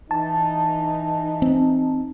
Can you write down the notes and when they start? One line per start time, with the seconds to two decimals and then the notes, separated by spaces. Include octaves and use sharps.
0.11 E3 D#4 A5
1.42 C4